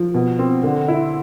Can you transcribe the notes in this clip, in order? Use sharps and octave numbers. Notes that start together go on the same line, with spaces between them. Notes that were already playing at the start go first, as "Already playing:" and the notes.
Already playing: F3
B2
C4
D3
E4